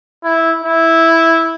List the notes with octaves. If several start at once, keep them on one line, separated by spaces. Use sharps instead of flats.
E4
E4